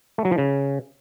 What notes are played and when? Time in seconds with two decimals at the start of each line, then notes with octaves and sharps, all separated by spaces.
0.18 A3
0.25 F#3
0.31 F3
0.38 C#3